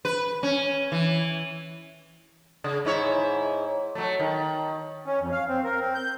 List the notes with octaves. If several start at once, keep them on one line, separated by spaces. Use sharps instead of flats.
B4
C#4
E3
C#3
G#2 E4 C#5
F#3 A3
D#3
C#4
F2
F5
C4
A#4
C4
G6